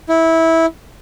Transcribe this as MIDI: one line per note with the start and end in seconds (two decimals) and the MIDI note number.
0.09 0.66 64